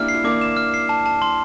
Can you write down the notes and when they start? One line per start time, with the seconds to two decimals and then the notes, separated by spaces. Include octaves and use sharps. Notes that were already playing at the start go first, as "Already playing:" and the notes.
Already playing: A#3 D4 E4 G4 A#4 F6
0.08 C7
0.14 E4
0.24 A#3 D4 D6
0.41 E7
0.57 F6
0.74 C7
0.89 A5
1.06 A5
1.22 C6